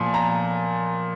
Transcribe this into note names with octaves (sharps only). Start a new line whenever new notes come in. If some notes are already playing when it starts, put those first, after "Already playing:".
Already playing: A#2 F3 G#5
A#5